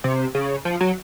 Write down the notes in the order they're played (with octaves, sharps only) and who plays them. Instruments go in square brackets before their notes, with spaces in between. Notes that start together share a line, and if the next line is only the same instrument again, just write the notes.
[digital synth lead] C3
C#3
F3
F#3